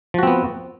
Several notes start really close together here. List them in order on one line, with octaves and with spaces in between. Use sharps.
F3 F#4 C4 B3